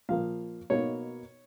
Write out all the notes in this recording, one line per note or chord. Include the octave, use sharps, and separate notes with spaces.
A#2 F3 A#3 F5
B2 A#3 D#4 C#5